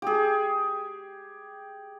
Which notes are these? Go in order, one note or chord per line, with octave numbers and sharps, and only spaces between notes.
G4 G#4